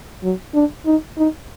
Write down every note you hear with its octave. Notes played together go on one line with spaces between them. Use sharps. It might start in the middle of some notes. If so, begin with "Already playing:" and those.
F#3
D4
D#4
D#4